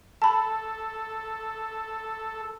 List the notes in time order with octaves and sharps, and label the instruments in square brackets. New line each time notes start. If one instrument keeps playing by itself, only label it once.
[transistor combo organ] A4 [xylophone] A5 B5